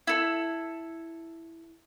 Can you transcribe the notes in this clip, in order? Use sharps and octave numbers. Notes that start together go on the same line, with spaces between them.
E4 A4